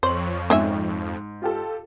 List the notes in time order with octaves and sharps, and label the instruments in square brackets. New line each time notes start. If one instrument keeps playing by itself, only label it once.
[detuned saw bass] F2 [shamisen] C5 [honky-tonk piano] C#5 F#7
[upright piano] G#2 [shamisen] C4 C#4 E5
[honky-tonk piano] F4 G4 A4